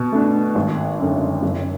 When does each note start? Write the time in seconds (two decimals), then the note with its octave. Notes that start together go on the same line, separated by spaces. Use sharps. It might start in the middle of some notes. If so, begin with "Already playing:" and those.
Already playing: B2
0.12 A3 D4
0.55 G#1
1.00 F#2 D3
1.42 F#1